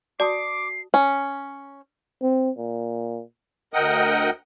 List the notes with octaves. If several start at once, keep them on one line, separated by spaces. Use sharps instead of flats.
F#4 D5 A5 D6 D#6 C7
C#4
C4
A#2
D2 A#4 D#5 F#5 G5 D#6